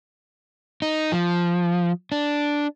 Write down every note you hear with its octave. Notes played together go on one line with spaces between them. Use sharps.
D#4
F3
D4